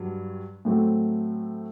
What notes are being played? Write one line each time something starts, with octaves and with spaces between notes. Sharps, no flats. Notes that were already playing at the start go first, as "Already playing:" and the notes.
Already playing: G2 F#3
A2 F#3 A3 C4